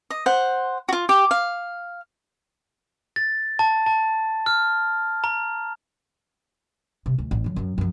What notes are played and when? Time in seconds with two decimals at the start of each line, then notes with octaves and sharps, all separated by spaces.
0.10 D#5
0.26 C5 F#5
0.89 F4 F#4
1.09 G4
1.31 F5
3.16 A6
3.59 A5
3.86 A5
4.46 F6
5.24 A#5
7.06 C3
7.18 D2
7.31 A1
7.44 D3 F#3
7.56 F#2 F#3
7.78 F#2 F3